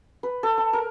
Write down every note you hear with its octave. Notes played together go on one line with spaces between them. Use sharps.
B4
A4
A5
A#4